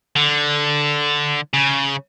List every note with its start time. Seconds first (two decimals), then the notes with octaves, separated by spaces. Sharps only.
0.16 D3
1.54 C#3